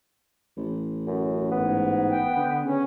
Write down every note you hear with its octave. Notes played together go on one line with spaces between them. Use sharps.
A1
F#2
G#2 B3
G5
D3
C#3 C#4